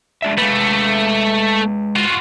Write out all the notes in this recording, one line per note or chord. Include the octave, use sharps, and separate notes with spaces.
G#3 D4 E5
G#3 A3 B4
F4 F#4